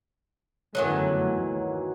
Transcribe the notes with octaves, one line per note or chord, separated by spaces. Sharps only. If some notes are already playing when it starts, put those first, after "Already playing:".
G1 F#2 D#3 E3 F#3 A3
D#2